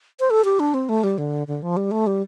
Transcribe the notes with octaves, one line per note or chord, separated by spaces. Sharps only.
C5
A4
G4
D4
C4
A3
G3
D3
D3
F3
G3
A3
G3